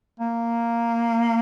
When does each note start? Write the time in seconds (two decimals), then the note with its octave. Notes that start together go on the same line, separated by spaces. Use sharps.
0.19 A#3